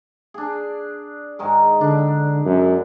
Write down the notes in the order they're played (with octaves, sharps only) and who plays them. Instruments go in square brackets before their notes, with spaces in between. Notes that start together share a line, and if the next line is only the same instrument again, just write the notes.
[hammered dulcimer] D4 G#4
G#2 D#3 G#3
[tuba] D3 [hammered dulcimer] D4
[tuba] F#2